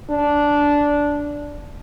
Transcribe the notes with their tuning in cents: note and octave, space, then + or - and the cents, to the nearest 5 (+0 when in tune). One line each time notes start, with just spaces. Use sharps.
D4 -10